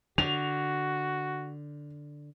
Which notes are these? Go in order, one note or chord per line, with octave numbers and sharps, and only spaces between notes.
D3 F#4 F7